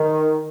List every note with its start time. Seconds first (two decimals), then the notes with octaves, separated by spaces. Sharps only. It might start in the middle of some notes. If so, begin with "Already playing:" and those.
Already playing: D#3